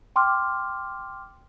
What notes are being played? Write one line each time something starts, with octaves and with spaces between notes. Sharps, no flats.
G5 C6 D6 F6